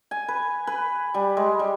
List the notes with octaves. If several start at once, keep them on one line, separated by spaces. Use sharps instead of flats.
G#5
B4
B4
G3
G#3
G3